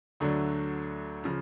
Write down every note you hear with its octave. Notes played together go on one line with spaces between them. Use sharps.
D2 D3 F#3 A3 D4
C#3 F3